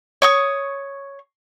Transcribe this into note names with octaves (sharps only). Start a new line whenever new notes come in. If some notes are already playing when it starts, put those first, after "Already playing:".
C#5 C#6 D#6